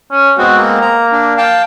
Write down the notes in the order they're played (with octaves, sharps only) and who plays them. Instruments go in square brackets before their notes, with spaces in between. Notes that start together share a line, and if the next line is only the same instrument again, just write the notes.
[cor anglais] C#4
[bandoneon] G#3 B3 C4 [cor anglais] F#4
[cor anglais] A#3
[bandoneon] A#5
D4
F5 G5 A5